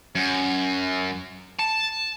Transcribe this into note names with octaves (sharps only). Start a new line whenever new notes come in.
F#2
A5